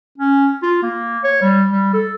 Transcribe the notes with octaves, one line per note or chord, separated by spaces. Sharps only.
C#4
F4
A#3
C#5
G3
G3
A4